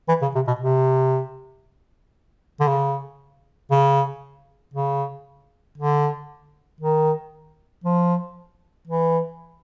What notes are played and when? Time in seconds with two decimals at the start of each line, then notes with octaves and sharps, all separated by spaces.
0.09 E3
0.22 C#3
0.35 C3
0.47 B2
0.61 C3
2.60 D3
2.67 C#3
3.71 C#3
4.74 C#3
5.78 D3
6.81 D#3
7.84 F3
8.87 E3